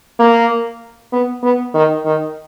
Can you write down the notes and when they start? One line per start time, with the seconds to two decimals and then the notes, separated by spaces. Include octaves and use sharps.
0.20 A#3
1.13 B3
1.43 B3
1.74 D#3
2.06 D#3